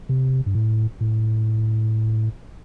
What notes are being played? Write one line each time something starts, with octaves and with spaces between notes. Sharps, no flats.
C3
G2
A2
A2